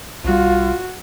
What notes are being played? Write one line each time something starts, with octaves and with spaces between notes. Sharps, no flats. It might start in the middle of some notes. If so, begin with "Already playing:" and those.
B1 G3 F4 F#4